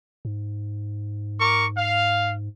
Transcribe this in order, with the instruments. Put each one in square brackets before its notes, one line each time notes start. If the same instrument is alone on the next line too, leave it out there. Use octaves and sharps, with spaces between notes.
[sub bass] G#2
[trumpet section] A#4 C#6 D6
F5